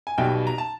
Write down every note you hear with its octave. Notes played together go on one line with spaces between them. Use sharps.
G#5
B1 B2 G3 G5
A#5
A5